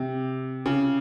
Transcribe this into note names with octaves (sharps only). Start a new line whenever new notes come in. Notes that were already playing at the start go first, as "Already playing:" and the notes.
Already playing: C3
C#3